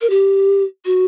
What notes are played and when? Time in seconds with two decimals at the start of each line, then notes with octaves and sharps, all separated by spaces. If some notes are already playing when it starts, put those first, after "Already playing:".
0.01 A#4
0.10 G4
0.85 F#4